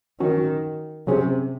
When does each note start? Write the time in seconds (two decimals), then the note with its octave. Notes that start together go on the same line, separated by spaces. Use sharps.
0.20 D#3 F#3 C#4 F#4
1.07 C3 F#3 C#4 G#4